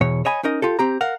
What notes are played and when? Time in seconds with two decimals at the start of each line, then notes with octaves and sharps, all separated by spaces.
0.01 E2 B2 C#5
0.25 C#5 D#5 G#5 B5
0.43 C#4 D#4 A#4 D#5
0.62 F4 G4 A4
0.79 C4 G4 A#5
1.01 A#4 F5 F#5